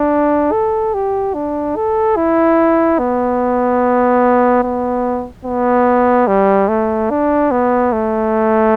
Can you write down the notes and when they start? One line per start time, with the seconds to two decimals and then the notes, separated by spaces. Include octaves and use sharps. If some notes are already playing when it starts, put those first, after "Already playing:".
Already playing: D4
0.52 A4
0.94 G4
1.34 D4
1.76 A4
2.16 E4
2.99 B3
4.64 B3
5.45 B3
6.28 G3
6.69 A3
7.10 D4
7.51 B3
7.93 A3